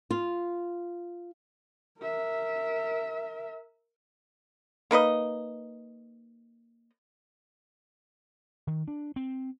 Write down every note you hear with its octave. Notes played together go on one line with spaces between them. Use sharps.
F4
A#4 E5
A#3 D#4 B4 D#5
D#3
D4
C4